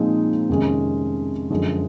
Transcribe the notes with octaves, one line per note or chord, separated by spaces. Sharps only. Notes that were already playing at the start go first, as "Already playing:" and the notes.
Already playing: A#2 F3 G#3 C4 D#4
F2 C3 D#3 G#3 C#4
F#2 D3 F3 G#3